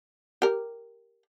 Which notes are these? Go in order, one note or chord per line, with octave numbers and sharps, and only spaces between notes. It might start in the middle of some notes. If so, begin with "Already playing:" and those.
G4 A#4